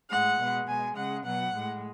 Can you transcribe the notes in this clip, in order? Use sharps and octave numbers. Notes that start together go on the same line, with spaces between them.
A2 G#3 F#5
B2 G#3
B2 G#3 G#5
C#3 G#3 F#5
B2 F#3 F#5
A2 G#3